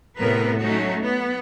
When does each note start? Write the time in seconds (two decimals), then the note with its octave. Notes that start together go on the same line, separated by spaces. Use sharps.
0.17 A2 C3 A3 B3 A#4 B4
0.60 F#3 A3 C#4 D#4 F#4
1.00 B3